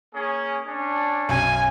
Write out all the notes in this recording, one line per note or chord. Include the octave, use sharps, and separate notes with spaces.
A#3 C#4 G#4
C#4 D4
B1 F#2 G#5